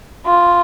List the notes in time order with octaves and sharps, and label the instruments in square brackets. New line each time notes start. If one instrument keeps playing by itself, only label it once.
[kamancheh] F4